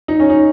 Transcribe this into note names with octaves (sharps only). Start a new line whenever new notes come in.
D#4
C#4
D#4